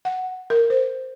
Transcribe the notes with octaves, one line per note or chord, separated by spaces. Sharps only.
F#5
A#4
C5